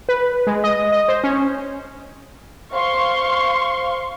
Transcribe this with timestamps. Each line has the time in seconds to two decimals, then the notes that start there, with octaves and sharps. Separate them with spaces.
0.09 B4
0.47 G#3
0.64 D#5
0.92 D#5
1.08 C5
1.24 C#4
2.74 C5 F5 C6 C#6